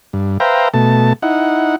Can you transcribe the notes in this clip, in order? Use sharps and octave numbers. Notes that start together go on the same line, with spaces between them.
G2
B4 C5 E5 F5 G5 A#5
B2 A3 A5
D#4 E4 F#5